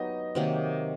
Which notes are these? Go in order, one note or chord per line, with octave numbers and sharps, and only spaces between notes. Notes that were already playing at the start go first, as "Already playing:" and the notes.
Already playing: F#3 B3 D#4 G4 D#5
C3 D#3 F#3 A#3